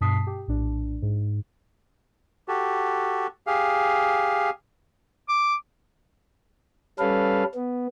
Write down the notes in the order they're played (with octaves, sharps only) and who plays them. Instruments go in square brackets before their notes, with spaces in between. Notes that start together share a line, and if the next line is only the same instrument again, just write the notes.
[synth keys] G2 B2 A5 D#6 B6 C7
G4
A#1 A2 D4
G#2
[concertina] F#4 G4 A4
G4 G#4 F5
[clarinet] D6
[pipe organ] G3 C#4 A4 B4 F5
B3